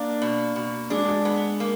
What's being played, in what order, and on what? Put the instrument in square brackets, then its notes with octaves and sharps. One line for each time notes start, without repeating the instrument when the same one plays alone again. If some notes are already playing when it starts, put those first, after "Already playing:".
Already playing: [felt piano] A#3 [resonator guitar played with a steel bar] D4
[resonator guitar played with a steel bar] B2
B2
[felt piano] G#3 [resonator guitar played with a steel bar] D4
[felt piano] G#3
[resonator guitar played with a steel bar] B3
A#3